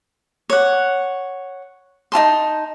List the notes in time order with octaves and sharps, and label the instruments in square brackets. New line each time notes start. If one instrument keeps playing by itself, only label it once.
[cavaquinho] C#5 F#5
D#4 F4 A5 C6